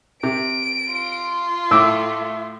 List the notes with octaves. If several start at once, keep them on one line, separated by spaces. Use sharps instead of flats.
C3 D7
F4
A2 A3 D6 E6